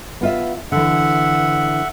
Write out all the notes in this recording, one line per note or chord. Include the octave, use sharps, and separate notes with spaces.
B3 F4 E5
D3 E3 E5 F#5